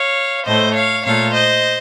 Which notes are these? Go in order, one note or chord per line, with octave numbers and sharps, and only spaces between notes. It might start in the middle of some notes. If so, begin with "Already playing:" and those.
Already playing: C#5 F5
A2 A3 C5 D#5
C#5 F5
A#2 A3 C#5 F5
C5 D#5